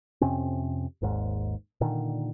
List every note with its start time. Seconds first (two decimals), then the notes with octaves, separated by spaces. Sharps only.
0.21 F2 C3 C4 C#4
1.02 G#1 D#2 G#2
1.81 A#2 D3 D#3